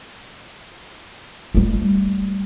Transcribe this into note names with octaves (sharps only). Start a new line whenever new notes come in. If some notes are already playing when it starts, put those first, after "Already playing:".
G3 A3